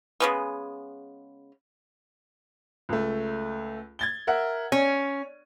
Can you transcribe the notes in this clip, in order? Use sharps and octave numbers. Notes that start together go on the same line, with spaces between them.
C#3 G#3 B3
C#2 A3
G#6 A6 G7
A#4 E5 F#5
C#4 C#5